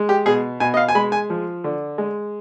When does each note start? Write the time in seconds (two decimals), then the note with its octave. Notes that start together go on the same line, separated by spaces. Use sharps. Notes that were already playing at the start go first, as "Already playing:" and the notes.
Already playing: G#3
0.09 G4
0.26 B2 G#4
0.60 B2 G#5
0.74 D#5
0.77 F5
0.88 G#5
0.95 G#3 B5
1.12 G#5
1.30 F3
1.64 D3
1.98 G#3